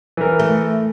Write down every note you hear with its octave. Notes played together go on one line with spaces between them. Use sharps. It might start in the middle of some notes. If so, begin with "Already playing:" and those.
E3 A#4
A3